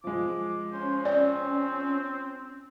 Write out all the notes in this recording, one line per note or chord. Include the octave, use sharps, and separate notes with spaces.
F3 G#3 D6
C#4 C5
C4 D5